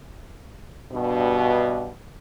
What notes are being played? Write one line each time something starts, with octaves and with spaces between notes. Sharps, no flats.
G2 B2